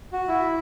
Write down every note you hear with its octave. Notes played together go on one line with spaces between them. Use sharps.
F#4
E4